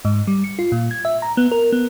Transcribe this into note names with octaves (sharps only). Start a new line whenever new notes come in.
G#2
G3
C#7
F4
A#2
G#6
E5
A#5
B3
A#4
B3